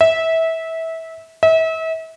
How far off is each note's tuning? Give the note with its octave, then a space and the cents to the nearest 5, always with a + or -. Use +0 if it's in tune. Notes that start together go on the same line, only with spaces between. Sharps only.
E5 -20
E5 -35